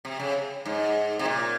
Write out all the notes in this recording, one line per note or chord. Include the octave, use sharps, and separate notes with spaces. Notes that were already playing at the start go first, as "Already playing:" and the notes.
C3
C#3
G#2
C3
A#2